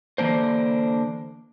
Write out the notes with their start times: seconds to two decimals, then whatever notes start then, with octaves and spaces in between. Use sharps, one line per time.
0.18 D3 E3 A#3 D4 C5